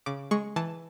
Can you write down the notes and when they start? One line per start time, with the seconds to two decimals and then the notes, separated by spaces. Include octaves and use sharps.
0.06 C#3 D6
0.31 G#3 C#6
0.56 E3 A5